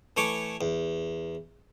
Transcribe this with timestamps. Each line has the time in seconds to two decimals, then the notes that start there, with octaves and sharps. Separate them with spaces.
0.17 E3 A3 C#5 D6
0.61 E2